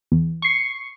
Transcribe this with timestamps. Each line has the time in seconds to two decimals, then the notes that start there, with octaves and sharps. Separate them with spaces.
0.12 E2
0.42 C#6 C7